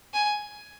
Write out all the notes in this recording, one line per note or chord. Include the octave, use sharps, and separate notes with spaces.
G#5